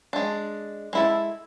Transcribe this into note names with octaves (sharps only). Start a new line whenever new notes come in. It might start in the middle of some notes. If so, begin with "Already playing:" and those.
G#3 D4
G#3 E4 A4